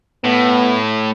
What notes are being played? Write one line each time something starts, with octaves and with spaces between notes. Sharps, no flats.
A2 B3